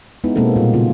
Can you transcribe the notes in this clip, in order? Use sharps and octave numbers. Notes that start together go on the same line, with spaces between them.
G#3 B3 D#4 E4
B2 G#3 A#3 C4 A4
A#2 G3 A3
C#3 F4